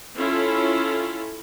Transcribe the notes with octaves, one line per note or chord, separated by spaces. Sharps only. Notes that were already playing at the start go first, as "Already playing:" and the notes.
C#4 E4 F4 A4